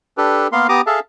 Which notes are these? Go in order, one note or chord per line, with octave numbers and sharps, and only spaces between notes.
D4 G4 A4 B4
A#3 B3 A#4 F5 C6
B3 G4 A#5 D6 D#6
G#4 A4 E5 F5 A5